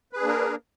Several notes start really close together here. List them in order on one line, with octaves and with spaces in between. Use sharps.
B4 G#4 D4 A#3 A#4